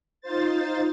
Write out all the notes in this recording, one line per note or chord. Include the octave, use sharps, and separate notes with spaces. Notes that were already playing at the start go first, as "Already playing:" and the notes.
D#4 F4 C5 A6